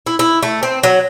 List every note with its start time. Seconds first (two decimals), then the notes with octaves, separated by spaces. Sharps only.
0.07 E4
0.19 E4
0.43 A3
0.63 C4
0.83 F#3